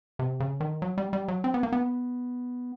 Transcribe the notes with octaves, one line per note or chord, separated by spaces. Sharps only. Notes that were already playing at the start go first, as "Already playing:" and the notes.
C3
C#3
D#3
F#3
G3
G3
F#3
C4
B3
A#3
B3